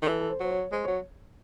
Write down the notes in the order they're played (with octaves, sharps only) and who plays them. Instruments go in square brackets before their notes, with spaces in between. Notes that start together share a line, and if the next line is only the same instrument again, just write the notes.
[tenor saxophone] D#3
[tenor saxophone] E3 [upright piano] A4
[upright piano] A4
C5
[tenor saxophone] F#3 [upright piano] C5
[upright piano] C#5
[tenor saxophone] G#3 [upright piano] C5
[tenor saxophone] F#3 [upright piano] C#5